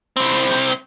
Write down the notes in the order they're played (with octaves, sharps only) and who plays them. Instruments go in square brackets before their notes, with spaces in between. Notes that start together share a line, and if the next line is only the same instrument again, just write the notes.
[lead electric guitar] C2 C4